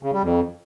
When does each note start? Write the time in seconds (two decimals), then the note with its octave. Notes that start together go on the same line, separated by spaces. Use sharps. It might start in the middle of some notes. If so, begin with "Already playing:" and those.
0.03 C#3
0.13 G3
0.23 F2